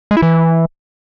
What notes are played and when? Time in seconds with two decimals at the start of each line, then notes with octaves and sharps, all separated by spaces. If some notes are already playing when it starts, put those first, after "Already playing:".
0.11 G#3
0.17 E4
0.22 E3